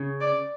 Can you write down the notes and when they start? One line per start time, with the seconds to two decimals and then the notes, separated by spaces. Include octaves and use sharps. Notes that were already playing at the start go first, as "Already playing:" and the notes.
Already playing: C#3
0.21 D5